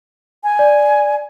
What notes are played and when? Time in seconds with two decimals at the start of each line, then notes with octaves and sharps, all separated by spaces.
0.44 G#5
0.59 D5